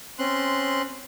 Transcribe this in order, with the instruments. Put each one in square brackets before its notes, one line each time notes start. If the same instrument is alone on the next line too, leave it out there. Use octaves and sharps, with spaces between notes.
[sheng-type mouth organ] C4 C#4 C6 F#6